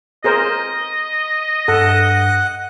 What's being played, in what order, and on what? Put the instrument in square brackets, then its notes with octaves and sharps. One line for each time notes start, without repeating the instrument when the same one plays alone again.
[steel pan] G#4 A#4 C5 [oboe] D#5
[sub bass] G2 [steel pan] A4 [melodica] F#5